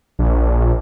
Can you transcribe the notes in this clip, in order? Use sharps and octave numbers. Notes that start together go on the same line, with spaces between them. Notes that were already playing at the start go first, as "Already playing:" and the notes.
A#1